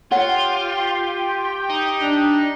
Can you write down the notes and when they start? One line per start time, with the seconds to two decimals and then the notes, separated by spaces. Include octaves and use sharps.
0.11 F4 G4 C#5 F#5 G5
1.70 D#4
2.02 D4